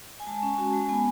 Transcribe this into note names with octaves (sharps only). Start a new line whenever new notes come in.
G#5
G#3 A5
C#4
F#4
G#3
B3 G#5